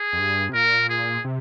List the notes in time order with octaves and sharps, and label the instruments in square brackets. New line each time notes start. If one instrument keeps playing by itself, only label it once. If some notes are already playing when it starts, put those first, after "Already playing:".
Already playing: [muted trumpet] G#4
[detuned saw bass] F2
G2
C3
[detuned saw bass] A#2 [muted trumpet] A#4
[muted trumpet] G#4
[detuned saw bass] C3